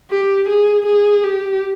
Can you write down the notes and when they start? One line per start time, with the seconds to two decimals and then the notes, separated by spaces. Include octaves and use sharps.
0.10 G4
0.49 G#4
0.86 G#4
1.24 G4